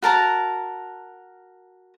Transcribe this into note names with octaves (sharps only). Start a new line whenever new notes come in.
F#4 A#4 A5 A#5